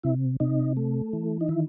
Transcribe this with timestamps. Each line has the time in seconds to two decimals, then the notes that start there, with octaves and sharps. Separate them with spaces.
0.03 C3 E4
0.40 C3 D#4
0.77 A3
1.13 E3
1.41 D#4
1.48 D#3 E4